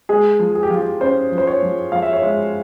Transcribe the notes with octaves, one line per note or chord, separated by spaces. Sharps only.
G#3 G#4
F3
G#4
G4
F3 F4
G4
C#4 C5
F3
C5
C#5
F3
F3 F5
E5
C#5
G#3 E5